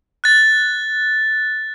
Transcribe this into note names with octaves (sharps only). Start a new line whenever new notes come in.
F#6 A6